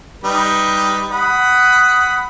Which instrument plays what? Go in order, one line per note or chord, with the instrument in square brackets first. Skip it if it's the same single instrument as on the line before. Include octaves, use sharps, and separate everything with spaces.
[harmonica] G3 D#4 B4
F#5 B5 D#6